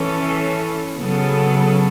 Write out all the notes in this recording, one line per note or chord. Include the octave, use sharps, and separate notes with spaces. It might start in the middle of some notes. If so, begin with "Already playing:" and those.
Already playing: E3 C#4 A4
C#3 F#3 B3 A4